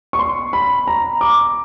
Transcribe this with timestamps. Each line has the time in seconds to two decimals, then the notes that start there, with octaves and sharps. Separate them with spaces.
0.13 C#6
0.19 C6
0.53 B5
0.87 A#5
1.21 D6